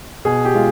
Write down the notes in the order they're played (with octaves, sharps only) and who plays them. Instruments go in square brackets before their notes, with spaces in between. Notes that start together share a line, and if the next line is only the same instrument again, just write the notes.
[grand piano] B2 G#4
G4
G#3 F4